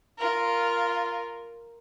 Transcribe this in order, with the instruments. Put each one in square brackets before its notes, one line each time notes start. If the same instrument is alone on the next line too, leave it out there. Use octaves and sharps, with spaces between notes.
[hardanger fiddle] F4 A#4